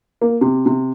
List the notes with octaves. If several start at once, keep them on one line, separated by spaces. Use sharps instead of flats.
A#3
C3
C3